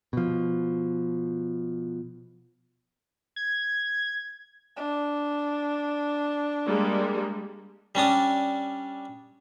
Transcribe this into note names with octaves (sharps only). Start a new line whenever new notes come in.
B2 F3
G#6
D4
G3 G#3 A#3
G3 C#4 D4 D#6